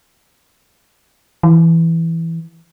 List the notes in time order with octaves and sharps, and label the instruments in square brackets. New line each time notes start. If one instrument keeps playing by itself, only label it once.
[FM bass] E3